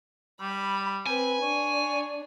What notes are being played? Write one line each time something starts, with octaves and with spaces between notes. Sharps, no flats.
G3 B5
C4 B4 G#5
D4 C#5